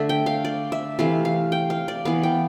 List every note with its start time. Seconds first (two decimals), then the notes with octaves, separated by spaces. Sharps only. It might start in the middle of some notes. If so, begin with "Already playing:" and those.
Already playing: D3 A3 E5
0.09 G5
0.26 F5
0.45 D5
0.72 E5
0.99 C3 E3 A3 F5
1.25 F5
1.52 G5
1.70 F5
1.88 D5
2.05 E3 B3 F5
2.23 G5